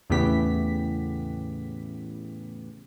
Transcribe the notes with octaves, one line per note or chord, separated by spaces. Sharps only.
E2 A2 C#3 B3 G4 B6